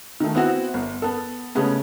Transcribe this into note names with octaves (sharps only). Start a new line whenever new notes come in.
D#3 A3
B3 C4 E4 F#4
G1
B3 A4
C#3 G#3 A3 B3 C#4